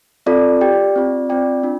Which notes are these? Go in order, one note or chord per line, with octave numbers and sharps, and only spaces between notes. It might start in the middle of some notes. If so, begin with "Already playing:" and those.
C4 F4 A4 D5
G4 D5 G5
C4 F4 D5
C4 F4 D5 G5
D4 F4